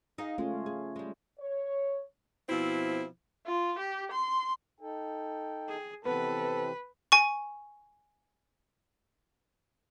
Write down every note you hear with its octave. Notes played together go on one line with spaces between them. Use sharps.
D#4 G#4 F5
G#3 A3 C#4 F4
G#4
G3 G#3
C#5
B2 F3 C4 E4
F4
G4
C6
D#4 A4 G5
G#4
C3 E3 B3 C4 A4 B4
G#5 C#6